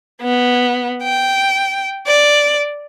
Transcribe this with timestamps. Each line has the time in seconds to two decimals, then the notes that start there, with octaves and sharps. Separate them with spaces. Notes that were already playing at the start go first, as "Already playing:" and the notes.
0.22 B3
1.03 G5
2.07 D5